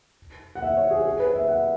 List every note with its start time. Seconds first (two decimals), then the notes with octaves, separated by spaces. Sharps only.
0.55 F#5
0.62 E5
0.77 C#5
0.91 G#4
1.05 G#4
1.19 B4
1.34 E5
1.48 F#5